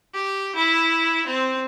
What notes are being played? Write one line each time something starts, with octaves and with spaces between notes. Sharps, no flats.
G4
E4
C4